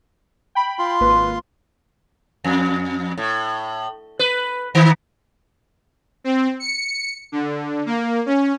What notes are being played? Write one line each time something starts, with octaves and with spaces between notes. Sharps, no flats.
G5 B5
F4 C6
G#1 A#3 B4
F2
A2
B4
D#3
C4
C#7
D3
A#3
C#4